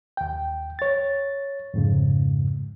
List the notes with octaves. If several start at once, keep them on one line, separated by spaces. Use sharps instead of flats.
D#2 G5
C#5 A6
F2 G#2 C#3